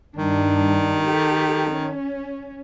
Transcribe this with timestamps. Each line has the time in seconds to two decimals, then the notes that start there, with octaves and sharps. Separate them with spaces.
0.16 G2 D#3 D4
1.03 G4 A4
1.71 C#4